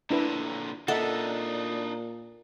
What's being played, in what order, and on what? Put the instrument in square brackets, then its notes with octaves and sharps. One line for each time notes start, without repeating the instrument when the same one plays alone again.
[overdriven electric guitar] A#2 D3 [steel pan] D4 E4 B4
[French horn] A#2 [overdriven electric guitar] D4 D#4 [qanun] A4 [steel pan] D#5 E5 F#5